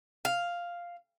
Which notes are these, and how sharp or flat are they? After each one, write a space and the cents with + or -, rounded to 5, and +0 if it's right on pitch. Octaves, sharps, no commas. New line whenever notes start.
F5 +0